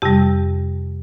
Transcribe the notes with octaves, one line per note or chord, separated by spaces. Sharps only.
F2 C3 G3 G4